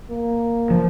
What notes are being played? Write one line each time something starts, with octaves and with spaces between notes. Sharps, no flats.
A#3
F3